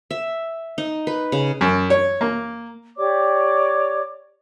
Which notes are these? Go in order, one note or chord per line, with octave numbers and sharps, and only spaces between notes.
E5
D#4
B4
C#3
F#2
C#5
A#3
G4 C#5 D5 D6